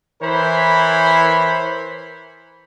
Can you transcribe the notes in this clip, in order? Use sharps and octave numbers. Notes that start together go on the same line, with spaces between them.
E3 A#4 C5 C#5 B5